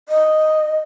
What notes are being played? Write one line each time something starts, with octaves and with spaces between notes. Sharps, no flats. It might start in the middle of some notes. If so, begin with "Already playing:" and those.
D#5